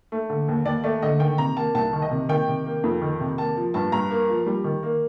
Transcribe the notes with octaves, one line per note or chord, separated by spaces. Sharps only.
A3
D3
D#2
D#2 D5
A3 D5
D3 D#5
D#3 G5
C3 A#5
A#3 A5
C2 A5
D#3
D#5
C3
D#3 G5
C3
A#3
F2
D#3
C3
A#3 A5
F3
G2 A5
G2 A#5
A#3
F3
G3
D#3
A#3